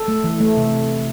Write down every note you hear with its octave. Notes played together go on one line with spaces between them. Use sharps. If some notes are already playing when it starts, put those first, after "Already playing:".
Already playing: A4
A3
E3
A3
C3